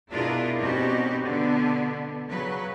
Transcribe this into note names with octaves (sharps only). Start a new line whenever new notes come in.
B2 D4 E4 F4 G#4 A#4
B2 C4 C#4 D#4 F#4 G4
B2 D3 B3
C#3 F#3 B4